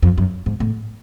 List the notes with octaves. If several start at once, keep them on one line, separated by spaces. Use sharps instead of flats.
F2
F#2
G#2
A2